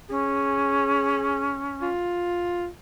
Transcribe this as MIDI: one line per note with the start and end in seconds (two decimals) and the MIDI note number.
0.10 1.88 61
0.10 1.55 68
1.82 2.68 65